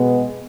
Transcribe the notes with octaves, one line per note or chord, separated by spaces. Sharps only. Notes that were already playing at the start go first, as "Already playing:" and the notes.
Already playing: B2 G#3 B3